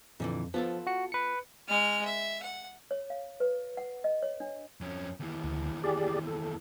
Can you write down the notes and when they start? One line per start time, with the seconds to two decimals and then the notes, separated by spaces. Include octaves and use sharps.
0.20 F2 A#2 D3 E3
0.54 F3 B3 F4 A4
0.87 F#4 C#7
1.12 B4 C#7
1.68 G#3 F6
2.05 E5
2.42 F#5
2.91 C#5
3.10 F5
3.40 B4
3.77 F#5
4.04 D#5
4.23 C#5
4.40 D4
4.81 F2 C#4
5.20 D#2 E3
5.44 D2
5.84 G4 G#4 D5
6.27 A4